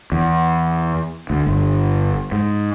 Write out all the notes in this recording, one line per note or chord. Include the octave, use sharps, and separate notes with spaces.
E2
D2
G1
G#2